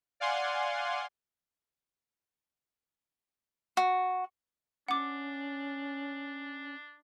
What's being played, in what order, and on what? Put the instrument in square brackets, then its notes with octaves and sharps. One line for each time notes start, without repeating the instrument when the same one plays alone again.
[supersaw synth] D5 F5 F#5 G#5 C6
[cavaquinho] F#4
[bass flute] C#4 [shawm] D4 [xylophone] F#5 D6